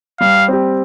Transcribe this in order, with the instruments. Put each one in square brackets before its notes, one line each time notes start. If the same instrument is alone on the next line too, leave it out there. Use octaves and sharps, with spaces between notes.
[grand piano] G3 [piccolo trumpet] F5
[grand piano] C4 G4